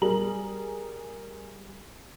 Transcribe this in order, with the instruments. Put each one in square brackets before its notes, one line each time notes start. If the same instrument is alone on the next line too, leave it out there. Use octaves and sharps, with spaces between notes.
[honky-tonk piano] G3 G#4 A#4 A#5 F#7